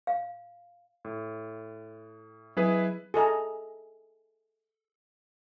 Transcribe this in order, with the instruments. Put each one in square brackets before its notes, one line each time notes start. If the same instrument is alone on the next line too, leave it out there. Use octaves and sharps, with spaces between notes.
[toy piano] F5
[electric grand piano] A2
[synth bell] F#3 [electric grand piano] E4 G#4 B4
[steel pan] G#4 A4 D#5 A#5